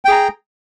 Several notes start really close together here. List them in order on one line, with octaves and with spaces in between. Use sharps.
G5 G#4 A#5